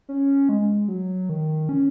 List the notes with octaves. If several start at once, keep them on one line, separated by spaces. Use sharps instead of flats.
C#4
G#3
F#3
D#3
C#4